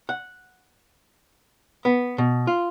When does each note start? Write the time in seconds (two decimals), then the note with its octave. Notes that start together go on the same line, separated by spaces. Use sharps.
0.09 F#5
1.85 B3
2.18 B2
2.47 F4